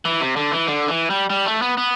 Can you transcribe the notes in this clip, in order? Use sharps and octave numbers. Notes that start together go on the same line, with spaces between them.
E3
C3
D3
E3
D3
E3
G3
G3
A3
B3
B3